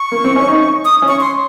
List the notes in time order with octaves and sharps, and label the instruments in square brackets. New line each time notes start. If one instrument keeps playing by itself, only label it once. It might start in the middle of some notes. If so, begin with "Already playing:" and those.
Already playing: [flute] C#6
[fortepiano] A#3
C4
C#4
D#4
[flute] D#6
[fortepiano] C#4
[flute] C#6
C6